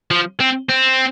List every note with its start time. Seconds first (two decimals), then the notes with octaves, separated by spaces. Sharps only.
0.11 F3
0.40 C4
0.69 C4